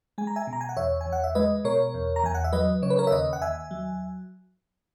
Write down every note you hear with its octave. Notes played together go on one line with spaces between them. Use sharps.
G#3 G#5
A#5
E5 G#5
B2
A#5
G#5
F#5
E2 C#5 E5
G#5
E2
F#5
E5
G#3 B4 D#5
B2 A#4 C#5
E2
A#5
E2 G#5
F#5
E5
F#3 B4 D#5
C#3 C#5
B4
A#4 C#5
E5
D#2 B4 D#5
F#5
D#2 E5 G#5
F#3